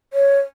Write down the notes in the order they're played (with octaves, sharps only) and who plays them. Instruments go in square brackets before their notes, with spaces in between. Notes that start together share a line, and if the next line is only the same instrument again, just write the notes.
[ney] C#5